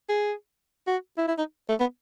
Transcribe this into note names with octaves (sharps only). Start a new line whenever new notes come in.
G#4
F#4
E4
E4
D#4
A3
B3